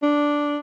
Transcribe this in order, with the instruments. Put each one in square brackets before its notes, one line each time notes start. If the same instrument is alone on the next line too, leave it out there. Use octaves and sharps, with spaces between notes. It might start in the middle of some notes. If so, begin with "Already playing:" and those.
[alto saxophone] D4